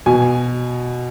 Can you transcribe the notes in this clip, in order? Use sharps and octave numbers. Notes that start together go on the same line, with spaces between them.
B2 G#5